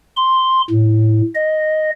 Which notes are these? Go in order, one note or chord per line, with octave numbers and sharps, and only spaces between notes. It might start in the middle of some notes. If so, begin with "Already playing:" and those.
C6
A2
D#5